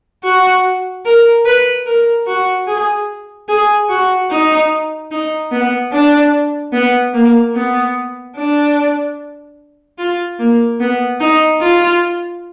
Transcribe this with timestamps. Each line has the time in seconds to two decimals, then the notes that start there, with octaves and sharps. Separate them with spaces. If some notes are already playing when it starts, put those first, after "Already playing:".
0.24 F#4
1.05 A#4
1.45 B4
1.86 A#4
2.27 F#4
2.67 G#4
3.48 G#4
3.89 F#4
4.30 D#4
5.11 D#4
5.51 B3
5.93 D4
6.73 B3
7.14 A#3
7.55 B3
8.37 D4
9.98 F4
10.39 A#3
10.80 B3
11.20 D#4
11.61 F4